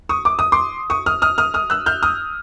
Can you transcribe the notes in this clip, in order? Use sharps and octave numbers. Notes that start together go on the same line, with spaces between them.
C#6 D#6
D6
D#6
C6 D6
C#6 D#6
D#6 F6
D#6 F6
D#6 F6
D#6 F6
E6 F#6
F6 G6
D#6 F6